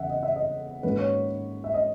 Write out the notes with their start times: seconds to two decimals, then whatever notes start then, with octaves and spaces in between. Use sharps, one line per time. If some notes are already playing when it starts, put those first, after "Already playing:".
Already playing: E2 C#3 E5 F#5
0.10 D#5
0.23 E5
0.36 D#5
0.83 G#2 D#3 F#3 A#3 C#4 B4
0.99 C#5
1.64 E5
1.74 D#5